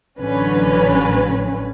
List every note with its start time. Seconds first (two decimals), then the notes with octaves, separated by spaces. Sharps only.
0.19 A1 D3 F#3 C#4 B4